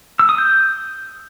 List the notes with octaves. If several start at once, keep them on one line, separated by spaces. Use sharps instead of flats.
E6
D#6
G6